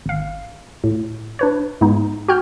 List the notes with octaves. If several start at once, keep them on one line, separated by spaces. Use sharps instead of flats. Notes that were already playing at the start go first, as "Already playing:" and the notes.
G#1 F5
A2
D4 B4 C#5
G#2 G#3 B3 D#4
F#4 G5 F6 G6